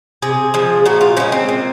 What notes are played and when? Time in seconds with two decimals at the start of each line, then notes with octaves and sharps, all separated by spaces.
0.22 C3 G#4
0.54 F3 G#3
0.85 A#2 F#4
1.01 F4
1.17 F3 G#3 C#4
1.32 C4
1.49 A#2